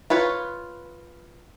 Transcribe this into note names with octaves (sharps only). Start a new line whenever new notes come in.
F4 B4 C#5